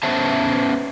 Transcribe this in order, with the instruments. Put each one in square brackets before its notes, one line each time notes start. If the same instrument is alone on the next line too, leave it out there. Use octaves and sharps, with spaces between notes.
[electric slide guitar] B3 C#4 C5 E5 A5